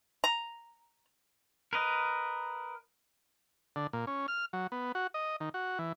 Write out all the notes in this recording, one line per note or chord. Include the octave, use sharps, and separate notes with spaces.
A#5
A#4 B4 D#5
D3
A#2
C#4
F6
F#3
B3
F#4
D#5
D#3
F#4
E3